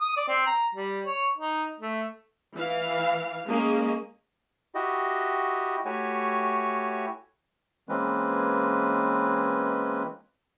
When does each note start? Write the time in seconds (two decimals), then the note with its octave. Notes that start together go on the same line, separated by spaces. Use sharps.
0.01 D#6
0.17 D5
0.28 C4
0.47 A#5
0.75 G3
1.06 C#5
1.38 D#4
1.80 A3
2.55 E3 F5
3.48 G#3 A#3 C#4 D#5
4.75 E4 F#4 G4 D#5
5.85 A3 E4 F#4 G4 C#5 G#5
7.89 E3 G#3 A#3 C4 C#4 B4